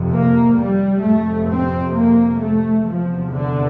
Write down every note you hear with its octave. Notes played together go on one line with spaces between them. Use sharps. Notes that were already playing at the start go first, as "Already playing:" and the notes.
Already playing: F2 C3
A#3
G3
F2 C3 A3
C4
A#3
A3
E2 C3 F3
D3